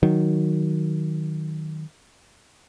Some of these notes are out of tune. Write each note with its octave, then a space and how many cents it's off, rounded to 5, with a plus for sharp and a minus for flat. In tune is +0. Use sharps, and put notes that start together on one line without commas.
D#3 +0 F#3 +0